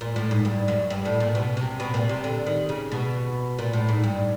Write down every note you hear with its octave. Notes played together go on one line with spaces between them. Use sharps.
A#2
A2
G#2
G2
F#2
G2
A2
A#2
B2
C3
B2
A#2
C3
D3
D#3
C#3
B2
A#2
A2
G#2
G2